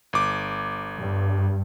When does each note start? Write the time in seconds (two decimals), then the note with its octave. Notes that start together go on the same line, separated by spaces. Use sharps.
0.13 G1 D6
0.96 G2